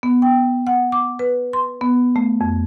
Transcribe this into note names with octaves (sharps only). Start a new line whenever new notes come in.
B3
G5
F#5
D6
B4
C6
B3
A3
F2